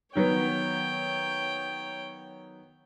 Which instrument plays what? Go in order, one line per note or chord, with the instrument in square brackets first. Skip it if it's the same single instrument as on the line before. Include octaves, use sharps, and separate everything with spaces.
[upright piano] D#3 F#3 B3 [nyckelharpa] C#5 G5